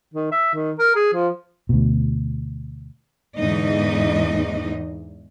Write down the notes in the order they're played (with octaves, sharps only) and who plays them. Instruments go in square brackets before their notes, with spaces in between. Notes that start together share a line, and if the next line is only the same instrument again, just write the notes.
[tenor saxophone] D#3
E5
D#3
A#4
G#4
F3
[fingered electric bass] D2 B2
[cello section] E2 G#2 D3 E3 D#4 D#5